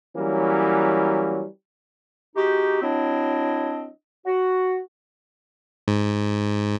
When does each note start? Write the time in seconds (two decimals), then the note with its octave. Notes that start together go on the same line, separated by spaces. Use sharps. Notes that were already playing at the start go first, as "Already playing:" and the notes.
0.16 E3 F#3 G3 A#3 C#4
2.35 G#3 D#4 F#4 G4
2.81 F#3 C4 D4 E4 D#5
4.25 F#4
5.88 G#2